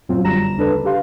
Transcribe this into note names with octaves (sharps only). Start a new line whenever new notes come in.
F#2 A#2 F#3 C4 F4
G1 D3 G3 A#5 A#6 E7
D2 C#3 D4 A4 B4
G4 B4 F5 C6